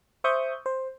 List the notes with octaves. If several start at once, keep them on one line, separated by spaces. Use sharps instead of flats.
C5 E5 C#6 D#6 G6
C5